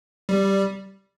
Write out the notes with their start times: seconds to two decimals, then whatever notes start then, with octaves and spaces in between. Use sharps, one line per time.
0.29 G3